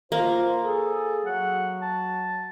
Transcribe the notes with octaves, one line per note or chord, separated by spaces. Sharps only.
A#3 F4 C5
G#4 A4
F#3 F#5
A5